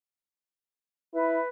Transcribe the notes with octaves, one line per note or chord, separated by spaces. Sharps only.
E4 B4